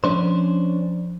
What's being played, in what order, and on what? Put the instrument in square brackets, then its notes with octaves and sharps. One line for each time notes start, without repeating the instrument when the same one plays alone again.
[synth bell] F3 [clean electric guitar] C#4 D4 C5